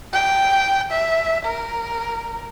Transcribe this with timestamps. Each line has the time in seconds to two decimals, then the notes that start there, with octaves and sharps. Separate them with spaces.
0.14 G5
0.92 E5
1.45 A#4